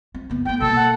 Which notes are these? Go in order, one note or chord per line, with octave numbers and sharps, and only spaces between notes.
C4
F#1 B3
G#3 B3 G5
B2 A#3 A4 E6
F#5